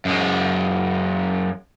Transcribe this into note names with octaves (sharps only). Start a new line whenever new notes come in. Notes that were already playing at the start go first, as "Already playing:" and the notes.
F#2 G#3